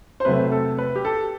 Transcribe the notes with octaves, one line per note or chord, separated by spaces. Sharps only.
C5
C3 F#3 A3 B4
A4
B4
G4
A4